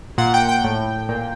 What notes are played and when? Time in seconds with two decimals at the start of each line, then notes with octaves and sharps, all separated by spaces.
0.18 A#2 F#5
0.34 G5
0.49 G5
0.64 A2
1.09 A#2